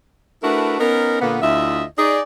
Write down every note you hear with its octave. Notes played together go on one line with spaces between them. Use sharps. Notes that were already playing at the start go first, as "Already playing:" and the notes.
A3 D4 E4 F#4 A#4 B4
B3 C#4 D#4 A#4
A#2 D3 A#3 B3
D2 E4 F4 D#5 E5
D#4 G#4 D5